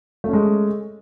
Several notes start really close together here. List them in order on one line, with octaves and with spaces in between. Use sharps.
A3 C#4 G#3